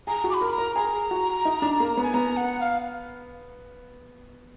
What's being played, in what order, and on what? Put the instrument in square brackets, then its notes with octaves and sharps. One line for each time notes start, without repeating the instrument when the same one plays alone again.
[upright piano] G#4 [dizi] A#5
[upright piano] F#4
[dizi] D6
B5
[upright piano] A#4
[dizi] A#5
[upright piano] A#4
[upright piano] G#4 [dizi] A#5
[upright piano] F#4
D#4
D4
A#3
B3
[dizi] G#5
[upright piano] B3 [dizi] A#5
[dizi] F#5
F5